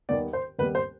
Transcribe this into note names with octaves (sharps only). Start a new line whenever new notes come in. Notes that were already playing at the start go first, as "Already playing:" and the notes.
D#2 D#3 G3 B3 D5
C5
D#2 D#3 G3 B3 B4
C5